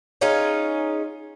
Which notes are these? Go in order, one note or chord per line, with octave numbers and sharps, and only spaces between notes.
C#4 D#4 F4 G#4